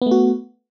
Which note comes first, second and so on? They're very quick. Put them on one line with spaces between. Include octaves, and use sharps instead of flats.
B3 A3 F#4